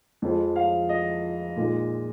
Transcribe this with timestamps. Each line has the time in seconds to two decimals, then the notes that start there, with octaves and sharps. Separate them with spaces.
0.22 F2 F3 G#3
0.56 F5
0.89 D#5
1.56 A#2 G#3 D#4